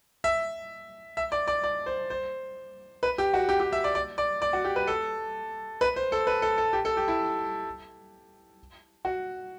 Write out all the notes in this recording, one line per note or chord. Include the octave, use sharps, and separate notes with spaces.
E5
E5
D5
D5
D5
C5
C5
B4
G4
F#4
G4
G4
E5
D5
D5
D5
D5
F#4
G4
B4
A4
B4
C5
A4
B4
A4
A4
G4
A4
G4
E4
F#4